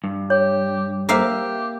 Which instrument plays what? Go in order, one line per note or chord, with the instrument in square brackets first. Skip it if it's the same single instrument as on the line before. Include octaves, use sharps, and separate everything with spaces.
[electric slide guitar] G2
[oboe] G4 [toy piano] C#5
[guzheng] A#3 E5 F5 [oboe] G4